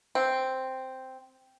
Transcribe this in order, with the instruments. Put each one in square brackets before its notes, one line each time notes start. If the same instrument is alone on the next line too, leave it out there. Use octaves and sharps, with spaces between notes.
[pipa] C4